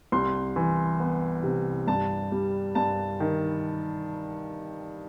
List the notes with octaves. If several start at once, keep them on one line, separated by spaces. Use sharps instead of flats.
C2 C6
E3
B3
C3
G2 A5
G3
G2 A5
D#3